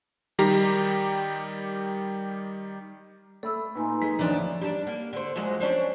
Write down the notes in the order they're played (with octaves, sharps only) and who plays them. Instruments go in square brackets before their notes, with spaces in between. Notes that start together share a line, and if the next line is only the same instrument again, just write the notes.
[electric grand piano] D#3 G3 G4 A#5 C7
[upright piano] A3 [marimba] A4 B5 E6
[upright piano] A#2 [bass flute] D#4 [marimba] B4 G#5 C6
[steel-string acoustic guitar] G#3 [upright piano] B6
[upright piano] D2 C#4 D5 [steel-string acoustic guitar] E3 F3 D4
[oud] G3 D4
A#3
D3 C5
F3 F#3 G#3
C#4 D4 C5